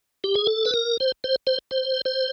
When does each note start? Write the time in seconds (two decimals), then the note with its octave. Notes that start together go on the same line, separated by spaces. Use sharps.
0.24 G4
0.35 G#4
0.47 A4
0.65 B4
0.74 A#4
1.00 C5
1.24 C5
1.47 C5
1.71 C5
2.05 C5